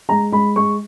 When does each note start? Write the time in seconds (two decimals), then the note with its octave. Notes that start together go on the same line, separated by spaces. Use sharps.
0.09 G#3 A#5
0.32 G#3 B5
0.56 G#3 C#6